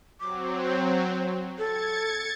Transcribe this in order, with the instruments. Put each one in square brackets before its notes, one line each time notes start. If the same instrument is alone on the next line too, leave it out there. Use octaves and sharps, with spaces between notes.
[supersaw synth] F#3 C4 [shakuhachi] D6
[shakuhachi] C5
[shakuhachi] A4 [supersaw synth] G#6 A6 C#7